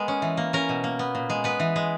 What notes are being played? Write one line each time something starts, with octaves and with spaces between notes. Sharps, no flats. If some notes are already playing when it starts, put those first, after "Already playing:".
Already playing: G#3 B3 A#4
C#4
E3
A#3
C#4 A#4
B2
A#3
B3
A#2
G#3
B3 B4
E3
G#3